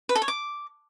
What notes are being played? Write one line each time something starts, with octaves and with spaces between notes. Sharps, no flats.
B4
A4
C#5
D6